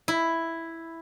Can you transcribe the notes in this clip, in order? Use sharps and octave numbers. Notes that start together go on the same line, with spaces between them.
E4